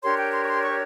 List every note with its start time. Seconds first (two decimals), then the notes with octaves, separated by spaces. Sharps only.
0.02 D4 G4 A#4 C#5 C6
0.18 G5
0.32 C6
0.43 C#6
0.47 C6
0.63 C#6